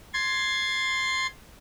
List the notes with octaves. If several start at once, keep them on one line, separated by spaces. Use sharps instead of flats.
C6 G#6 A6